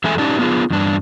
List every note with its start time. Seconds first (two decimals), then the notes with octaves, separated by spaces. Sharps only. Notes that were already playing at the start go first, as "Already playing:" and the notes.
0.04 E2 G#3 A3 A4 E5 G#5
0.18 C#4 D#4 G4 D5 A5
0.39 B3 D4 F4 G#4
0.70 E2 G2 D4